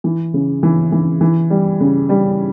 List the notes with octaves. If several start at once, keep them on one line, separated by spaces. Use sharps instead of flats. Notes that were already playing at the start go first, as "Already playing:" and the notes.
E3
C#3
E3
E3
E3
G3
C#3
G3